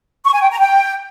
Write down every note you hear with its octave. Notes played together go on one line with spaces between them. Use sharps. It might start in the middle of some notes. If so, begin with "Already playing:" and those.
C#6
G#5
G5
A#5
G5